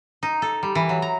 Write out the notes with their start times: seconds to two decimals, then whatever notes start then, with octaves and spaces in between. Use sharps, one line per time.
0.23 D#4
0.42 A4
0.63 G3
0.75 E3
0.89 F#3
1.02 A#5